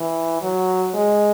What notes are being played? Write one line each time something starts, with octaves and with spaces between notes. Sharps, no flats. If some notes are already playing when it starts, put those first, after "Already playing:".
Already playing: E3
F#3
G#3